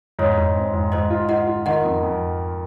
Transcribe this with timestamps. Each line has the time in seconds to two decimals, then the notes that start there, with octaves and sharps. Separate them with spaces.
0.19 G#2 C#5
0.37 G#2
0.56 C4
0.73 G#2
0.92 G#2 C5 D#5
1.10 F4
1.29 F4 D#5 F#5
1.47 F4
1.66 D#3 D#5 F#5
1.85 F2
2.02 F2